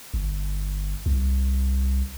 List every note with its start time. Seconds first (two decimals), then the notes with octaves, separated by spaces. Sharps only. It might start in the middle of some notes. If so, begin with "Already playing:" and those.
0.14 G1
1.06 C2